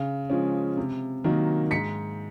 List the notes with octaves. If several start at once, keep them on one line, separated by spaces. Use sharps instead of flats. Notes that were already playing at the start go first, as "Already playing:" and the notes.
Already playing: C#3
F3 G#3 C#4
C3
D#3 F#3 A#3 D#4
G#2 B6 C#7